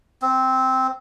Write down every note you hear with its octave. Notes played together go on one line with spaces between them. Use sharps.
C4